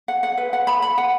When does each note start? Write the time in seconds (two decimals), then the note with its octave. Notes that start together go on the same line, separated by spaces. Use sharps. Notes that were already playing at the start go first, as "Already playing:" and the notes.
0.08 F#5
0.23 F#5
0.38 B4
0.53 F#5
0.67 B5
0.82 B5
0.98 F#5